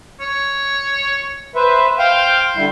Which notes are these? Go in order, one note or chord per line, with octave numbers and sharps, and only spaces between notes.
C#5
B4 C5 E5
C5 F5 G5
D3 G3 E4 C6